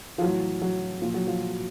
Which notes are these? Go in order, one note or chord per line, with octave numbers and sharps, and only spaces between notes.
F3
A2 E3 F#3
F#3
A#2 F3
F#3
F3